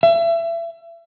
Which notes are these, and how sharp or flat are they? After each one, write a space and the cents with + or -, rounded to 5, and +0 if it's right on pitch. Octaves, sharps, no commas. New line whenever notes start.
E5 +30